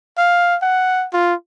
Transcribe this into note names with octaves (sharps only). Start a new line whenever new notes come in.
F5
F#5
F4